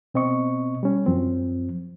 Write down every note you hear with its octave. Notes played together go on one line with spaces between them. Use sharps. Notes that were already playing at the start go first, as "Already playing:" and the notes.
B2 C4 D#5 C#6
G3 C#4
F#2 F3 C4